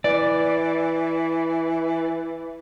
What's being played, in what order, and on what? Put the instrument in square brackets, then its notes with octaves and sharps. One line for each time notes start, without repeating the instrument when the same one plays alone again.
[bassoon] E3 [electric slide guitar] D5